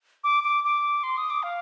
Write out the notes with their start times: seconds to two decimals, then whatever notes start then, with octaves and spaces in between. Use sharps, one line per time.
0.24 D6
0.44 D6
0.64 D6
1.03 C6
1.17 D#6
1.30 D6
1.43 F5